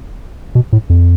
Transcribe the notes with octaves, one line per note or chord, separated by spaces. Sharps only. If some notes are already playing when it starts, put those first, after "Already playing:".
B2
A2
F2